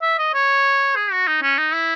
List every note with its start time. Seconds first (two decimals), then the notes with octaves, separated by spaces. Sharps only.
0.02 E5
0.19 D#5
0.34 C#5
0.96 G#4
1.12 F#4
1.28 D#4
1.42 C#4
1.58 D#4
1.74 E4